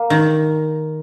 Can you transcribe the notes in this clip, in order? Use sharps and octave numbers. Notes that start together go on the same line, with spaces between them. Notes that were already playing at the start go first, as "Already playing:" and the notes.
Already playing: A#3
D#3